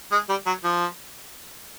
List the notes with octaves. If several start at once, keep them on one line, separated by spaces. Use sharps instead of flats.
G#3
G3
F#3
F3